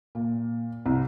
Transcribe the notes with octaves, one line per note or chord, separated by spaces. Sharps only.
A#2
C2